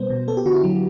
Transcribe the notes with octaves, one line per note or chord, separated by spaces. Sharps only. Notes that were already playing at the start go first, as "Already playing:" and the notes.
Already playing: B2 G3 B3 C5
B2
B3 A4
G4
D3 F#4
E4
F#3